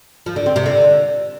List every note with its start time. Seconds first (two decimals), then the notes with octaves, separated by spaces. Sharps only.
0.26 F3
0.36 D3
0.46 C4
0.56 C3
0.66 D3